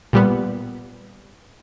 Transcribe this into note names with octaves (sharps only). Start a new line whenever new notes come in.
A#2 G3 B3